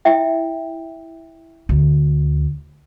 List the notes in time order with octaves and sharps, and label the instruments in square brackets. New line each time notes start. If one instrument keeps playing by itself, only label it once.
[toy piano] E4 E5 G5
[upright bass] D2